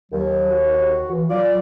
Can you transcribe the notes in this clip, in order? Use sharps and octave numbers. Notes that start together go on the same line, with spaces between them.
D#2 F#3
F#4
E3
F#3 F4 D5